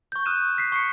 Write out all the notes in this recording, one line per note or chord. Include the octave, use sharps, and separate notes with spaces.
C#6 G6
D#6 F6 F#6 D#7 E7
F6 B6 C7
C#6 C7 C#7